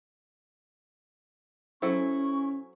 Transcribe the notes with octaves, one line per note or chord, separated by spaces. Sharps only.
F#3 C#4 E4 A4 C5 C#6